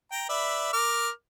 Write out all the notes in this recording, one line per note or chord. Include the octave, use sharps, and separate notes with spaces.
G5 A#5
B4 D5 E5
A#4 D6 F6